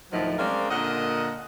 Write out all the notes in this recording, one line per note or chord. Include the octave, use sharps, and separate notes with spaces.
D2 A2 D#3 F3 F#3 D#4
G#3 C4 C#4 A#4 D5 F5
A#2 D3 A#4 D#5 F#5